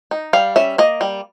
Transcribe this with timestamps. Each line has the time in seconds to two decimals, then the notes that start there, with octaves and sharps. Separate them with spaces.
0.11 D#4
0.33 G3 F5
0.56 C#4 E5
0.78 A#3 D#5
1.01 G3